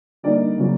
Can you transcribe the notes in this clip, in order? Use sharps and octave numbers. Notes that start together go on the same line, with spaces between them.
D3 G3 A#3 D#4 D5
C#3 F#3 A#3